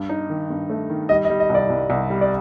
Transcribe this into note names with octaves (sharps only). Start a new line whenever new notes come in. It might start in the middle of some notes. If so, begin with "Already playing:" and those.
Already playing: G2
D#4
D#3
G2
A3
D#3
G3 D#5
D#5
G3
D#5
C2 D5
C2
C2
G3
D5